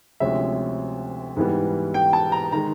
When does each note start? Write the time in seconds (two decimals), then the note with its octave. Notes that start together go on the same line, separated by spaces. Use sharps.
0.20 D2 C3 F3 G#3 C#4 E5
1.36 G#2 E3 G3 B3
1.94 G5
2.13 A5
2.32 A#5
2.52 D#3 G#3 A#5